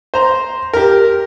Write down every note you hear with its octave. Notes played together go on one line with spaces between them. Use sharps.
C5 A#5
G4 A#4